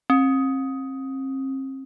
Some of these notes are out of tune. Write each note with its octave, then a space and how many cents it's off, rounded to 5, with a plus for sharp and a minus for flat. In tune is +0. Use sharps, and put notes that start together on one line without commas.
C4 +40